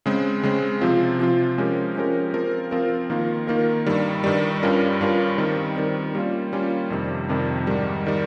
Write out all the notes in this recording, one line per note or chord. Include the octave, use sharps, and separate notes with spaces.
C#3 G#3 C4
C#3 G#3 C4
C3 F3 C4 F4
C3 F3 C4 F4
F3 G#3 C#4 G4 A#4
F3 G#3 C#4 G4 A#4
F3 C4 F4 A#4
F3 C4 F4 A#4
D#3 A#3 F4 A#4
D#3 A#3 F4 A#4
G2 D#3 G3
G2 D#3 G3
G2 G3 C#4 F4 A#4
G2 G3 C#4 F4 A#4
D#3 G3 C4
D#3 G3 C4
G3 A#3 C#4 F4
G3 A#3 C#4 F4
F2 C3 D#3 G3
F2 C3 D#3 G3
G#2 D#3 G3
D#3 G3